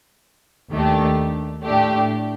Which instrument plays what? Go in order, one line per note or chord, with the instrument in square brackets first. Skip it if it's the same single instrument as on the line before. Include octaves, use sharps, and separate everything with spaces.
[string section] D#2 D#3 A3 D4 G4
A2 A3 D4 G4